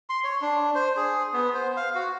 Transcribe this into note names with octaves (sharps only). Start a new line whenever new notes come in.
C6
C#5
D4
C5
G#4
B3
C5
F5
F#4